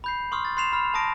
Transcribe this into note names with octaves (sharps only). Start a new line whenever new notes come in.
B5 G6 C7
C6 C#6 D#6 F6
A6
C6 F#6 C7 E7 F7
B5 F6
A5 A#5 D#6 A#6 D7